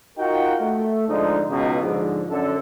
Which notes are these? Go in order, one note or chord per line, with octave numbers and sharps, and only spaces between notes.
D#4 F4 F#4 A#4 F#5 G5
A3
G#2 D3 F3 D#4
C#2 B2 D#4
G#2 D3 F3
F#2 D3 A4